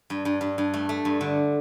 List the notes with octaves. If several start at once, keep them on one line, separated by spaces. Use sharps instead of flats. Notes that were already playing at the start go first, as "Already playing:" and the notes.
G2
G2
G2
G2
A3
A3
G2
D3